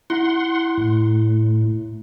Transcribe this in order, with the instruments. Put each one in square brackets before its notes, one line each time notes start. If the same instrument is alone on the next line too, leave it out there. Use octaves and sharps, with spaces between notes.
[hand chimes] E4 [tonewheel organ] F#5 C6
[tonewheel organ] A2